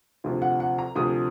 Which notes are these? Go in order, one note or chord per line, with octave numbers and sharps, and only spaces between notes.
D2 C3 F3
F#5
F#5
A#5
D2 C3 F3 D#6